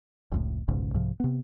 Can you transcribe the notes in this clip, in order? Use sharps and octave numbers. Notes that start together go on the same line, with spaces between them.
F1 C#2 A2
F1 B1 G#2 C#3
C2 G#2 C3 F3
C3 B3